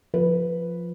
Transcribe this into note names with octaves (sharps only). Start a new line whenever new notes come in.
F3 B4